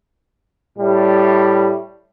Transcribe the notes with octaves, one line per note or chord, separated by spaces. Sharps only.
A2 G3